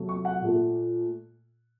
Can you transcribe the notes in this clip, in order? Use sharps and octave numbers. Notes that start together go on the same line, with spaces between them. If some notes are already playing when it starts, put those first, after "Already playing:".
Already playing: C3 F#3 A3
C#6
F#5
A#2 A3